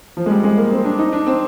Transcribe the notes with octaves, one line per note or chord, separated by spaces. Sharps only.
F3
G#3
G3
G#3
A#3
C4
D4
D#4
D4
C4